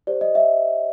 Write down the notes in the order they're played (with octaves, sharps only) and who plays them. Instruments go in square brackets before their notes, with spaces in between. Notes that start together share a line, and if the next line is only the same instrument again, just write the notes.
[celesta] G4 C5 D5
D#5
E5